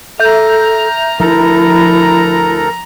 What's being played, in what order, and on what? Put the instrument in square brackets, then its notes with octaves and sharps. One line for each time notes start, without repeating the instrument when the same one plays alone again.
[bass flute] A4 [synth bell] E5 G6 [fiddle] A#5 F6
[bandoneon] D2 A4 A#4 [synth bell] F3 [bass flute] E4 [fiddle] A#5